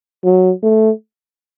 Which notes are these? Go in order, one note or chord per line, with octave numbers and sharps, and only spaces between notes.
F#3
A3